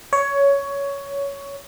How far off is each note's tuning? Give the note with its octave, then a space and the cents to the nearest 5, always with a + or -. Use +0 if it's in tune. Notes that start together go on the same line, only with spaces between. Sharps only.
C#5 +15